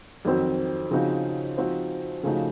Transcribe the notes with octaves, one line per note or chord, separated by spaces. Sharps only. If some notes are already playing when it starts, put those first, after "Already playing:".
F2 D#3 F#3 C4 F#4
C#3 F3 C4 D#4 F#4
F3 C4 D#4 F#4
C#3 F3 A3 D#4 F#4